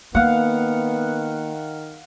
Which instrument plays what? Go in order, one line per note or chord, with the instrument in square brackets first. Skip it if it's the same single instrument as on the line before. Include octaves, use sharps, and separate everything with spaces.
[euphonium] D#3 [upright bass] A#3 [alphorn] B3 [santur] F5 F#5